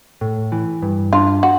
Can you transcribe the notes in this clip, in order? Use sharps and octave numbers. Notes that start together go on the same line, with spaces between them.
A2
E3
G2
D4 F4
F#4